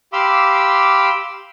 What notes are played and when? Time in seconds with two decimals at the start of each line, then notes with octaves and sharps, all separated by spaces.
0.13 G4 F5 B5 C6 D6 E6